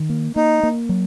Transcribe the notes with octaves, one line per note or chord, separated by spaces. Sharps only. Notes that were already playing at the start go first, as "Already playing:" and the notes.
Already playing: D#3
A#3
A#3 D#4
A#3
F#3